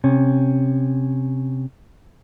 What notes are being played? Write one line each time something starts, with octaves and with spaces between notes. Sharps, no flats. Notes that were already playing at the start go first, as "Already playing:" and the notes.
C3 C#4